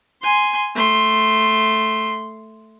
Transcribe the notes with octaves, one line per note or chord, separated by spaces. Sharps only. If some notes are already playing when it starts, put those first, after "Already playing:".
G#5 C6
A3 C6